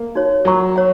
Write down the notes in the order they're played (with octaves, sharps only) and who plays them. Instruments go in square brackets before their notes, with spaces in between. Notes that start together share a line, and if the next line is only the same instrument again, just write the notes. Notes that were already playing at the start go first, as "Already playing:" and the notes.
Already playing: [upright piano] A#3
[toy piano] D#4 F#4 C#5
[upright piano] F#3 [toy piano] A#4 F#5 A#5 C#6
[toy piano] C#5 F#5